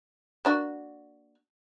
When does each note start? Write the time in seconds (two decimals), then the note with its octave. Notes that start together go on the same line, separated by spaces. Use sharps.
0.45 A#3 D4 F#4